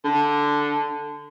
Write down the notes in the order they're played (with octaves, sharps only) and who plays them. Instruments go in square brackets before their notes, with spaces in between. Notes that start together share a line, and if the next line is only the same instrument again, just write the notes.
[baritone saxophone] D3